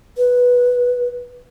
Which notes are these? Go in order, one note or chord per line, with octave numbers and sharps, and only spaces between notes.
B4